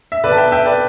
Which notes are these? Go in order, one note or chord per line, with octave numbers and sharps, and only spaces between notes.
E5
B1 B2 B4 D5
A5
E5 G5
E5 G5
B4 D5